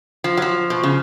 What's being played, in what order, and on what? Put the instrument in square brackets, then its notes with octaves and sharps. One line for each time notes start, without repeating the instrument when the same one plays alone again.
[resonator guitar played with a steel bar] F3
F#3
F3
B2
C#3